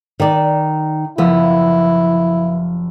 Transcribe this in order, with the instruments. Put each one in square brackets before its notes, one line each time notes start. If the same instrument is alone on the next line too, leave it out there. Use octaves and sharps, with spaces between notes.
[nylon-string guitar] D#3 D5
[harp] F#1 F3 E6 [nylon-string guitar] B3 [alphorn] E4